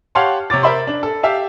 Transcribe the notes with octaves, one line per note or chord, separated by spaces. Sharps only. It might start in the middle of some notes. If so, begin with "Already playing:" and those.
G4 C#5 F5 F#5 A5 C6
C3 C#5 D6 A6
A#4 C5 E5 B5 C6
D4
A4
G4 E5 F5 A5